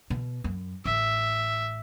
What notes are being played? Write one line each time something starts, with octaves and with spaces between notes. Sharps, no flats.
B2
F#2
A1 E5